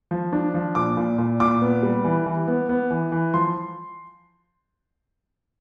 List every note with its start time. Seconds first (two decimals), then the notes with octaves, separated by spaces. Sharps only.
0.11 F3
0.33 D4
0.54 F3
0.75 A#2 D6
0.97 A#2
1.18 A#2
1.40 A#2 D6
1.61 B3
1.83 G3
2.04 E3
2.26 E3
2.48 B3
2.69 B3
2.90 E3
3.12 E3
3.34 F3 C6